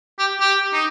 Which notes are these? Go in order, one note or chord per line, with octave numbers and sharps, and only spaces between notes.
G4
G4
D#4